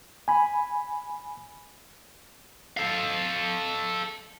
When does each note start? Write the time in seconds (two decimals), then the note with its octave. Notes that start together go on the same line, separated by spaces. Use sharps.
0.28 G#5 B5
2.77 A4 F5